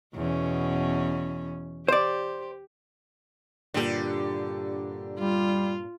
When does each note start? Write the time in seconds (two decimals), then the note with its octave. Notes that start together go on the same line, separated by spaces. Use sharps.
0.15 E2 B2 C#4
1.88 G4 C5 D5
3.74 G2 A#2 D3 G4
5.19 G3 F4